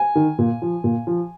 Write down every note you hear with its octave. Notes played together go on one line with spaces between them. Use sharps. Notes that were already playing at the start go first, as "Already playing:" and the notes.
Already playing: G#5
D#3
A#2
F3
A#2
F3